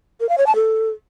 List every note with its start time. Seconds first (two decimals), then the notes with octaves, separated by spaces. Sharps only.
0.20 A#4
0.29 F5
0.38 C#5
0.47 A5
0.55 A4